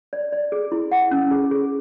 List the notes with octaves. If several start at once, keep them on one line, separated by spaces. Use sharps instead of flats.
D5
D5
G#4
E4
F#5
C#4
G#4
G#4